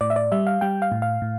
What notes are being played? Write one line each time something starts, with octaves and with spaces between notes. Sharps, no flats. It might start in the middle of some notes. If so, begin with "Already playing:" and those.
A2 D5
E5
D5
G3 E5
F5
G3 G5
F5
A2
F5
A2